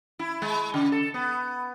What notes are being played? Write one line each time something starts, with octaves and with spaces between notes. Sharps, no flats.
E4
G#3
C#3
A4
B3